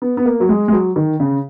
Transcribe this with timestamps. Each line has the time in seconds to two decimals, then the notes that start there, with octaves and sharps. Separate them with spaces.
0.02 B3
0.17 B3
0.25 A#3
0.40 F#3
0.49 G#3
0.68 G#3
0.73 F#3
0.96 D#3
1.20 C#3